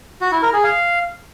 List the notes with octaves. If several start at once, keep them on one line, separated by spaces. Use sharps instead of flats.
F#4
E4
A#4
G#4
F5